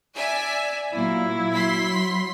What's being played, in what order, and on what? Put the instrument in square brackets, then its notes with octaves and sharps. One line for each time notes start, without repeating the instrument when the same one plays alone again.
[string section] D5 E5 G#5
[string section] A#2 [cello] F#3 A#3 [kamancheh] E4
[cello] F#3 [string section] B5 C6 B6